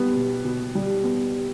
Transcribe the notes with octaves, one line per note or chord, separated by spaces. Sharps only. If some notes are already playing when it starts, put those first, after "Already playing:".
Already playing: G3 B3
B2
B2
G3
B3